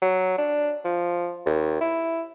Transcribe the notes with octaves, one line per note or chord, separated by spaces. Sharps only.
F#3
D4
F3
D#2
E4